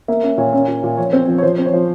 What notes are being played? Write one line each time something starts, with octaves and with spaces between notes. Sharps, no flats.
A#3 E5
C#4 E5
A#2 C#5
C#4 C#5
A#2
A#2
F3 C#5
C4
F3
C#5
F3 C5
C4
C#5
F3